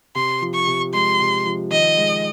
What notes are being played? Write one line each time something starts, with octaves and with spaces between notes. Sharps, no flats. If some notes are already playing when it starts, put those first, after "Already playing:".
C3 C6
F3
C#6
C3
G#3 C6
C3
F3
D#3 D#5
G#3